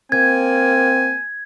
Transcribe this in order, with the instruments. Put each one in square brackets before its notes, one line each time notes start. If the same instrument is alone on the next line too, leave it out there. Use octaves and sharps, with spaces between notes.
[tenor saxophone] A#3 [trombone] C4 [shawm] G#5 [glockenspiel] G#6